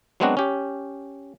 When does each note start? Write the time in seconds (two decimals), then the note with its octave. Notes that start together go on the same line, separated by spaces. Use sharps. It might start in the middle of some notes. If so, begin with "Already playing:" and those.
0.20 F#3 G#3 B3 C4 D4 F#4
0.37 C#4 G4